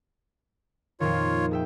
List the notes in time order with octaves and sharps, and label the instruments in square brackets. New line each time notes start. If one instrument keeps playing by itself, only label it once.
[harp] F2 A#2 D#3 [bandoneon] F4 C#5
[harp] G#4 E5 G5